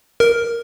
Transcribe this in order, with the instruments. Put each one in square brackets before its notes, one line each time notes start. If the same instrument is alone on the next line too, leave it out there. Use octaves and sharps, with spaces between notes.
[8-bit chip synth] A#4